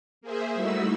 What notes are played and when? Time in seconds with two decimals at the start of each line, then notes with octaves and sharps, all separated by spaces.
0.21 A#3 G#4 C5 E5
0.55 G3 A3 D#4 E4 F#4 E6